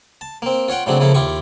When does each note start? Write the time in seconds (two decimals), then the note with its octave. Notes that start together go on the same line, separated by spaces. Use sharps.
0.21 A5
0.42 A#3 C4
0.68 F4 C#5 F#5 G5
0.86 A2 C#3 F#3 C4 D4 F#4
1.00 C#3 F3 A#3 E4 A4
1.14 D#2 E4 F4 G4 C#6